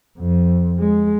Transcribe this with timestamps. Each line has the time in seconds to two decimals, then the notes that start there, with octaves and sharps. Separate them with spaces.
0.19 F2
0.78 G#3